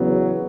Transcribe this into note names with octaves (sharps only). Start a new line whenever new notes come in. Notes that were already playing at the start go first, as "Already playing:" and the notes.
Already playing: E2 C#3 F#3 B3